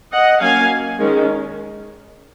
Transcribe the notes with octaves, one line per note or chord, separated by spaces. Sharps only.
D#5 F#5
F#3 A#3 C#4 F5 G#5
D#3 G#3 C#4